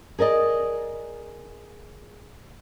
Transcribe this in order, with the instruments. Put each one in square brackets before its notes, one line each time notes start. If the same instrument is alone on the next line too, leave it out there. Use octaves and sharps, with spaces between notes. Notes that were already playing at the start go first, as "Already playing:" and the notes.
[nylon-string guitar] G#4 A#4 D5 D#5